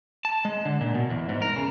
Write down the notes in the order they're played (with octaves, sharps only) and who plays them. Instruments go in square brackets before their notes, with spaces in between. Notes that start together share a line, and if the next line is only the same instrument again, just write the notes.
[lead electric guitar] A5
G#3
D3
A#2
B2
E2
G#2
A#4
C#3